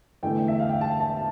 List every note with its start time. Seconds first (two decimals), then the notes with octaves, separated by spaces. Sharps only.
0.23 E2 D3 A3 G5
0.48 E5
0.59 F5
0.69 G5
0.81 A5
1.00 A5